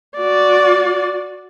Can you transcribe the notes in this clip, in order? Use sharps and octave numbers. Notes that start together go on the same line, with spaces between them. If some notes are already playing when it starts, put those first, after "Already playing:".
F#4 D5